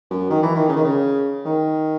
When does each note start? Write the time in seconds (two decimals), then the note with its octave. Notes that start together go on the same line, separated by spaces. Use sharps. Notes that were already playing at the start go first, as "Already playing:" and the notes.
0.10 F#2
0.30 D#3
0.43 E3
0.55 D#3
0.69 C#3
0.76 D#3
0.84 C#3
1.45 D#3